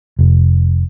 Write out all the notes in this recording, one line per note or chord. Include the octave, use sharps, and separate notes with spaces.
F1